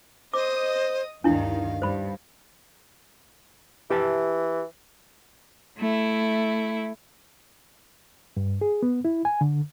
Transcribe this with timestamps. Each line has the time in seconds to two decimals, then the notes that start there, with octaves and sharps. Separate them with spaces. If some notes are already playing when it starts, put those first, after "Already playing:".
0.34 C5 D#5 D6 D#6
1.24 D2 G2 D#3 D4 E4 F5
1.82 G2 C5 B5
3.91 E3 G4 E5 A5
5.78 A3 E4
8.37 G2
8.61 G#4
8.83 B3
9.05 E4
9.25 G#5
9.41 D3